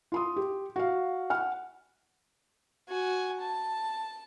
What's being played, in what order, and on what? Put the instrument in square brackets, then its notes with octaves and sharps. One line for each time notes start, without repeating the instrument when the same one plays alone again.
[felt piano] F4 C6 D#6
G4
F#4 F5
F#5 F6
[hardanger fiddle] F#4 G#5
A5